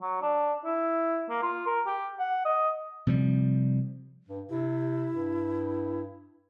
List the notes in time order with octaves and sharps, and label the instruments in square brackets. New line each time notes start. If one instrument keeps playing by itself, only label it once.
[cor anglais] F#3
D4
E4
A#3
F4
A#4
G4
F#5
D#5
[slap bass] C3 F3 G3
[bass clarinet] G2
[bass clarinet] C3 [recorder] E4
[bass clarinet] G2